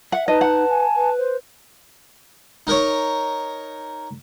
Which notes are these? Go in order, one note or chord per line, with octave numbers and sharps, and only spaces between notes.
E5 F#5
D#4 B4 D#5 A5
F#5
G#5
B4
C5
D#4 A#4 C#5